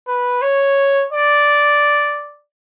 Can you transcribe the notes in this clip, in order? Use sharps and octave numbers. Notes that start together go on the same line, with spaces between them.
B4
C#5
D5